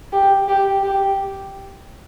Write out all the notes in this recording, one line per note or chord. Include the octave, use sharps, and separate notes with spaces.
G4
G4
G4